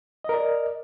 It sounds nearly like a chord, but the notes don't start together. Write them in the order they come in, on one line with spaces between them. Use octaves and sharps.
D#5 A#4 D5